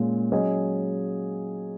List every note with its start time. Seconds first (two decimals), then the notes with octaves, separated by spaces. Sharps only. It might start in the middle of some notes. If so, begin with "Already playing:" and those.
Already playing: A#2 G#3 C#4
0.31 F#3 C#4 G#4 D#5